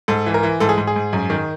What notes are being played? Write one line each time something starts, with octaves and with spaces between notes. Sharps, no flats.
G#2 A4
E3
A#4
E3
G#2 A4
G#4
G#2
G#4
G#2
F#2
D#3